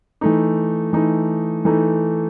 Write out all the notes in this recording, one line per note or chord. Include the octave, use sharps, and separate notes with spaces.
E3 A3 D#4
E3 A3 D#4
E3 A3 D#4